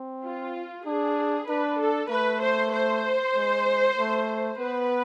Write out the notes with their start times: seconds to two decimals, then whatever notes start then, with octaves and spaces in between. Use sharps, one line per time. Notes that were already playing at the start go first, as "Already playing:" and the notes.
Already playing: C4
0.24 F4
0.86 D4 G#4
1.48 D4 B4
1.80 A4
2.10 A3 B4
2.41 C5
2.73 C5
3.36 G#3
3.98 A3
4.59 B3 B4